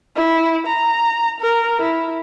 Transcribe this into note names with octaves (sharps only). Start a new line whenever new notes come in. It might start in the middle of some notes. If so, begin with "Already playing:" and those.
E4
A#5
A#4
E4